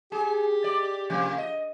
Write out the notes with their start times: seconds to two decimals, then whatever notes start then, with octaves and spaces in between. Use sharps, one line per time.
0.12 G4 G#4
0.64 D5
1.10 C3 F3 A#3
1.38 D#5